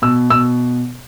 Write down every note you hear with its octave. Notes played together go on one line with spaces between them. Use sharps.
B2 E6
B2 E6